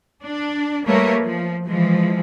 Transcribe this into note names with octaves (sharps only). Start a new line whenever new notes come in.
D4
G3 A3 A#3 A#4 B4 C#5
F3
E3 F3 G#3